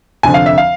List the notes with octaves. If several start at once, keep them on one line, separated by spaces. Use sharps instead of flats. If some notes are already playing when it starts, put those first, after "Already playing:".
F1 F2 D3 F3 G#5
F5
E5
F5